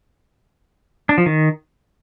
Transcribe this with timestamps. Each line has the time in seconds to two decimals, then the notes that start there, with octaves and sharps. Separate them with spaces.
1.09 D4
1.18 F3
1.26 D#3